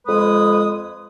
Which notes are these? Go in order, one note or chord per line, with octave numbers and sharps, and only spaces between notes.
F2 G#3 B4 D#6